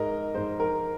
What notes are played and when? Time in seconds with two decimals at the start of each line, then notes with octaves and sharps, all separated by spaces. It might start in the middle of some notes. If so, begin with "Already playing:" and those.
Already playing: G#2 G#3 A#4 D#5
0.34 G#2 G#3 C5
0.60 A#4